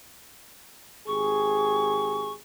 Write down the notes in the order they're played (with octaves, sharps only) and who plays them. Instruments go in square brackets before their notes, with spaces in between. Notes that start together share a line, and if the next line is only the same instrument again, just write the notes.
[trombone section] G#1 G4 G#4 [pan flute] C#6